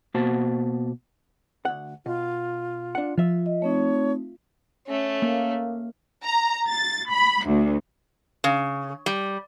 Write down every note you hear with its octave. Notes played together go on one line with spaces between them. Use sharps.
B2 A#3 F#4 C5 A5
D2 F#5
B2 F4
D4 F#5
F3 F4 E5
D#5
A3 C4 D#4 C#5
A3 C#4
A#3
A#5
A6
B5
D2
C#3
G3